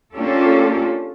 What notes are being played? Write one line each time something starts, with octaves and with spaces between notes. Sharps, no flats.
A#3 C#4 D4 F4 G4 A4